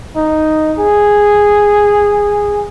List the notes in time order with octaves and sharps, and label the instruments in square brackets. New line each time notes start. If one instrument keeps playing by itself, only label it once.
[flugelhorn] D#4
G#4